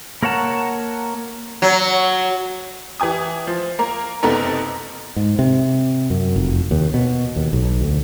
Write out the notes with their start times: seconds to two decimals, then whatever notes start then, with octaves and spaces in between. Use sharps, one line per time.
0.23 A#3 A#4 C#5 F#5 A5
1.62 F#3
3.00 E3 G4 G#5 D#6
3.47 F3
3.79 A#3 A#4
4.23 F#1 C3 B3 D#4 A4 A#4
5.16 G#2
5.39 C3
6.10 F#2
6.36 F1
6.71 D#2
6.94 B2
7.36 D#2
7.53 B1
7.81 D2